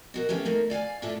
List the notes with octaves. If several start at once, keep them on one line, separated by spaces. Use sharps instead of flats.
B2 F#4 A#4
A3 B3 C#4 G4 E5 F5
A3 A#3 D#4
D5 F5 F#5 G#5
A2 D4 F4 A4 E5